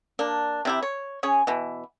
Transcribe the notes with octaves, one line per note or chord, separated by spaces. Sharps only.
A#3 D4
C3 E4 G4
C#5
C#4 G#4 C#5
B2 E3